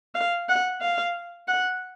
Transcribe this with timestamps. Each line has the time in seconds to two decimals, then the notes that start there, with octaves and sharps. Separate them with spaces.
0.15 F5
0.49 F#5
0.81 F5
1.48 F#5